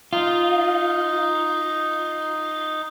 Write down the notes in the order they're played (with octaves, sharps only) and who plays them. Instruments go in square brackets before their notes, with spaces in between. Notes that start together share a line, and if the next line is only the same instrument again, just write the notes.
[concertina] D#4 [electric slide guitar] F4